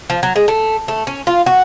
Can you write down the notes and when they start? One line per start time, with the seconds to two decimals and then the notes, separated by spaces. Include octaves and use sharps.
0.10 F3
0.23 F#3
0.36 G#3
0.48 A3
0.88 A3
1.07 C#4
1.27 F4
1.46 F#4